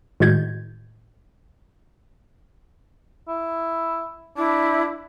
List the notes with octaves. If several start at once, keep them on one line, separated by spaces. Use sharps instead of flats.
A2 D#3 G#3 F#4 G6 G#6
E4
D4 E4